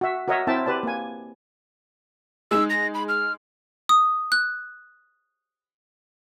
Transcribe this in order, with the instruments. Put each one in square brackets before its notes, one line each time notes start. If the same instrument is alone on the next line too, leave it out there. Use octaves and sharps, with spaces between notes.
[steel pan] F#4 E5
F#4 A#4 C#5 D#5 E5
C4 E4 A#4 E5 G5 A5
G4 B4 D5 A5
A#3 G#5
[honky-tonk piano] G#3 D#4 [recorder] E6
[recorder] A#6
B5
F6
[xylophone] D#6
F#6